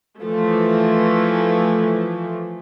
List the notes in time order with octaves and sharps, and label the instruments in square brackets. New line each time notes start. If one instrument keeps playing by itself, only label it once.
[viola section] E3 F3 A3